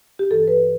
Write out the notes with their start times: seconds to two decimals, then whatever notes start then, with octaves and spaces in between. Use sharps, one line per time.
0.19 G4
0.31 G2 E3 A4
0.48 B4